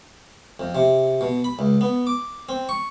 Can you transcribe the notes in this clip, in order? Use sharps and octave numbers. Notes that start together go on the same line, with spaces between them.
F2
C3
B2
B5
C#2
B3
D6
C4
C#6